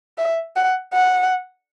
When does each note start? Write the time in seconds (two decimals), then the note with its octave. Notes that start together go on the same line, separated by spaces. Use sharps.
0.18 E5
0.56 F#5
0.93 F#5